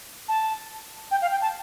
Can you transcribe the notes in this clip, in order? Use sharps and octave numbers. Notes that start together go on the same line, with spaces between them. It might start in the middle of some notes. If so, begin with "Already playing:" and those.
A5
G5
F5
G5
A5